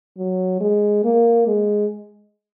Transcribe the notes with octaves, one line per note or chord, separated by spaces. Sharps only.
F#3
G#3
A#3
G#3